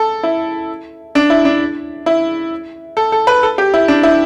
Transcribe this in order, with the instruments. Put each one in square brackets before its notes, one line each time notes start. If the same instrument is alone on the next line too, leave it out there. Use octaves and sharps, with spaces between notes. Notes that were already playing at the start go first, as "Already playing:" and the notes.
Already playing: [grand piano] A4
E4
D4
E4
D4
E4
A4
A4
B4
A4
G4
E4
D4
E4